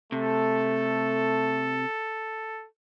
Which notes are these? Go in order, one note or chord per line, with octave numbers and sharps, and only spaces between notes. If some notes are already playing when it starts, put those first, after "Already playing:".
C3 A3 A4